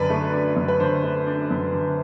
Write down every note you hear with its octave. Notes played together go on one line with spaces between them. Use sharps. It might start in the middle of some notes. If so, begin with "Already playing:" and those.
Already playing: F#2 D3 D4 B4 D5
A3
D4
F#2
B4
D3 C5
A3
D4
F#2
D3